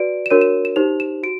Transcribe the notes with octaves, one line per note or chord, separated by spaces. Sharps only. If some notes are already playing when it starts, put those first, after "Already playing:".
Already playing: F#4 B4 D5 D7
E7
D4 F#4 A#4 C#5 D#7
E7
E7
D#4 G4 C5 F7
E7
F#4 D7